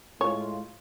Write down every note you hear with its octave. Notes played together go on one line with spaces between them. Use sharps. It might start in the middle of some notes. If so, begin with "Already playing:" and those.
A2 G#3 F4 C#5